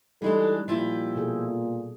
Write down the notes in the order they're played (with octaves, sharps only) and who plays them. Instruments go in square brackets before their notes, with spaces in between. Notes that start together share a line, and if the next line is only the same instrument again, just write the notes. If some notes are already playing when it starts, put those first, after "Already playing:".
[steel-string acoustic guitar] E3 G#3 D4 [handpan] G3 D#4 [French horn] A4
[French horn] A#2 [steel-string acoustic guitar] F3 E4 G4
[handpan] B2 G#4 A4